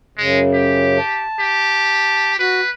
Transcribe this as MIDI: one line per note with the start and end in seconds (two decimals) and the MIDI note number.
0.17 0.99 42
0.17 0.99 49
0.17 0.40 56
0.54 1.24 67
0.99 2.32 81
1.40 2.35 67
2.39 2.61 66
2.39 2.70 71